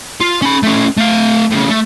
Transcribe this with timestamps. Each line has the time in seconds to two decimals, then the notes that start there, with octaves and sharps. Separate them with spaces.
0.21 F4
0.42 C#4 B5
0.63 A3 C#4
0.97 A3 F5
1.51 A2 C#3
1.68 A3